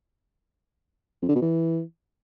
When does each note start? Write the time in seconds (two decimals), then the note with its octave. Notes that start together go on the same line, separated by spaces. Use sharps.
1.22 F2
1.29 D3
1.35 B2
1.42 E3